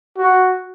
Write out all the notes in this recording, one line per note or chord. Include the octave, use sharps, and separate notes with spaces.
F#4